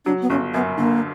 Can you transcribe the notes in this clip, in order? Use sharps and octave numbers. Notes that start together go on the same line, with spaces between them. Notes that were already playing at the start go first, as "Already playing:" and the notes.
F#3 D4
B3
G1 C#4
F#2 B3
D3 A#3